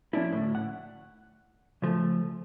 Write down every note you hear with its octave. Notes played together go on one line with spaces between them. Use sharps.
F3 A#3 C#4 D4 E4
D2 A2
F#5
C#3 F3 A3